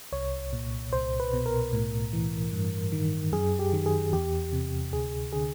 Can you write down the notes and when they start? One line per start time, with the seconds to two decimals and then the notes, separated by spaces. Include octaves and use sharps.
0.12 C2 C#5
0.53 A#2
0.93 C2 C5
1.20 B4
1.33 B2
1.46 A#4
1.73 A2
2.13 E3
2.53 G2
2.92 D#3
3.32 F#2 G#4
3.59 G4
3.73 D#3
3.86 G#4
4.13 E2 G4
4.53 C3
4.93 D2 G#4
5.32 D3 G#4